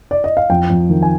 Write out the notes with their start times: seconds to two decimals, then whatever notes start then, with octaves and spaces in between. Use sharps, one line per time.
0.11 D5
0.24 D#5
0.37 F5
0.50 F2 G5
0.70 F2
0.89 D#3
1.03 G#5